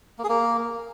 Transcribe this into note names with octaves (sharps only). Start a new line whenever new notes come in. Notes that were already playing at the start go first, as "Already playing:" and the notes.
A#3
G#4
A#3